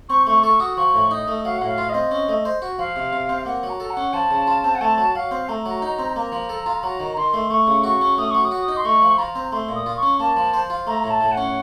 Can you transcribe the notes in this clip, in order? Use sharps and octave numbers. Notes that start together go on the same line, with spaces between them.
C4 C#6
A3 C#6
A4 C#6
F#4 D#6
F3 C#6
A2
D#4 D#6
A3
F#3 F5
F#5
A2
F5
F4
C4 D#5
C#4
A3
C5
F#4
F3 F5
C3
C3
C4
A#3 F#5
F#3
A#5
A4
F#5
C#4
F3 A5
C#3
F4
C4
F#5
A3 A5
F#3
F#3 F5
C4
A3 A#5
F#3
D#4
C4
A#3 A#5
F3
A4
F4
F#3 A#5
D#3
D#3 C6
A3
A3 C#6
C#3
F#4 C#6
C#4
A3 D#6
F#3 C#6
D#6
F#4
D#4
C6
A3 C#6
F3
F4 A#5
C4
A3 C6
A#2
D#6
F4
C#6
C#4
A#3 A5
F3
C5
F4
A3 A#5
A2 A#5
A5
A2
F#5
C#4